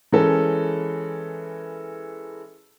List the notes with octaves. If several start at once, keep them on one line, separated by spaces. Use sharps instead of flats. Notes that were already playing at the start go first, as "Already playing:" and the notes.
E3 G#3 C#4 A4 A#4